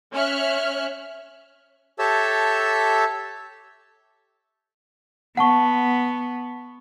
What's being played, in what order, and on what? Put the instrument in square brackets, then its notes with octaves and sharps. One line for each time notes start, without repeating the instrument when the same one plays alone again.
[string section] C#4 E5 F6 F#6
[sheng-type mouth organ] G4 A4 C#5 E5 A5 E6
[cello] B3 [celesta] F#5 A5 C#6